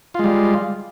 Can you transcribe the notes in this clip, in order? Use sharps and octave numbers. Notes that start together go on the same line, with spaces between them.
G3 G#3 F4